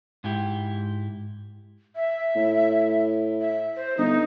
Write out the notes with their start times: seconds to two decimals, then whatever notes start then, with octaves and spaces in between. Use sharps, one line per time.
0.24 G#2 E4 G4
1.95 E5
2.35 A2
3.41 E5
3.76 C5
3.97 G1 D#4